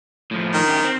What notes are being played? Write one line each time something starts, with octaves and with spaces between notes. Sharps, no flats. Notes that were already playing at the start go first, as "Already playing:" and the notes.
A2 F3
D#3
F#2 G4
C4